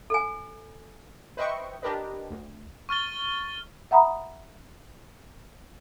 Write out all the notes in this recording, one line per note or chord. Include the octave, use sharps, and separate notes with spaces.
A4 G#5
B4 C5 D#5 E5 G5 C#6
D4 G4 A#4 B4 D#5
D2
C#6 F6 A6 G7
E5 F#5 A#5 B5 D#6